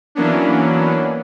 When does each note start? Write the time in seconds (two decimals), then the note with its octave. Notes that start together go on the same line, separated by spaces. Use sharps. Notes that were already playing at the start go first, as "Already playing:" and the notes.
0.15 E3 F#3 A#3 B3 C#4 D4